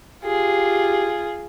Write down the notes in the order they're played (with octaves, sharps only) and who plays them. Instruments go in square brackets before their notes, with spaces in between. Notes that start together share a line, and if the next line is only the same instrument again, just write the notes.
[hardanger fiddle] F4 G#4 [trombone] G4